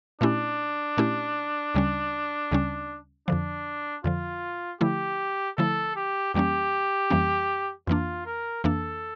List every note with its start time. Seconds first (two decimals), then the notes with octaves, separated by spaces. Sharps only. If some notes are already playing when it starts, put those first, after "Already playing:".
0.21 A#2 A3 C#4 D4 E4 G4
0.97 A#2 A3 C#4 E4 G4
1.75 D2 C#3 G3 C#4
2.51 D2 C#3 G3 C#4
3.28 F2 D3 F3 D4
4.04 F2 D3 F3 F4
4.81 D3 F3 A3 E4 G4
5.57 D3 F3 A3 E4 A4
5.96 G4
6.34 F2 E3 G3 A#3 C#4 G4
7.10 F2 E3 G3 A#3 C#4
7.87 F2 E3 A#3 D4 F4
8.26 A#4
8.64 F2 E3 A#3 D4 A4